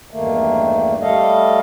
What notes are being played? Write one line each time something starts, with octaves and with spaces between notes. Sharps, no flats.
E2 G2 D#3 A3 A#3
G3 A3 A4 D#5 F5